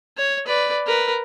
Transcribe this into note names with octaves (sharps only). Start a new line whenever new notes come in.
C#5
B4 D5
A#4 B4